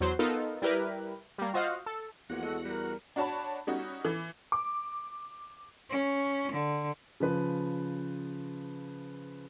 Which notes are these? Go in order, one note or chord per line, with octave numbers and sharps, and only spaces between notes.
E2 F#3 C5 C6
B3 D#4 F4 A4 A#4
G3 E4 G4 A#4 B4
G3 A#3
F4 F#4 C5 D#5 F5 F#5
A4
E2 F3 A#3 F4 F#4 F#5
G#3 A4 D#5 C#7
G3 A#4
D4 F#4 C#5 A5 B5
G3 C#4 D#4 F#4
E3
D6
C#4
D3
C#3 F3 B4